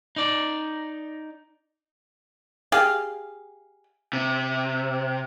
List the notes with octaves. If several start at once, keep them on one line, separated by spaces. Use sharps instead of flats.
D#4 D5
G4 G#4 F5
C3